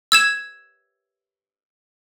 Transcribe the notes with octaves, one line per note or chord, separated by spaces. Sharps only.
E6 G#6 E7